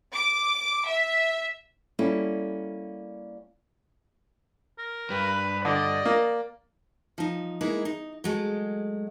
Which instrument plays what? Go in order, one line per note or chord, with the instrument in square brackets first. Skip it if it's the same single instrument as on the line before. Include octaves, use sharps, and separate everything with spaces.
[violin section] D6
E5
[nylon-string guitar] G3 A#3 C#4 E4 G4 A4
[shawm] A#4
[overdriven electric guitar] G2 [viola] B4
[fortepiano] D3 [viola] D5 [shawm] D#5
[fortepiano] A#3
[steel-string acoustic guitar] F3 D#4
G#3 A#3 D#4 E4 G#4
D#4
F#3 G#3 A3